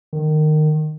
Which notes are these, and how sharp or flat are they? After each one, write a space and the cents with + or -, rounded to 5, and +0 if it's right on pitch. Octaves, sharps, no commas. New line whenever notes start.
D#3 -20